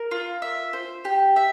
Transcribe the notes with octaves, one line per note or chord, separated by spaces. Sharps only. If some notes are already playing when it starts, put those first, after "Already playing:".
Already playing: A#4
F4
E5
C5
G4
E5